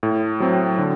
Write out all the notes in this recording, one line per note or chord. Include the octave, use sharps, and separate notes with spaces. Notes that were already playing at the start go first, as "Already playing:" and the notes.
A2
F#3 C4
D3